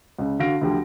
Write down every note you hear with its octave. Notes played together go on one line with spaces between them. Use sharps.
C#2 C#3
D3 F#4 F5 A#6 D7
D2 D3 F3 G4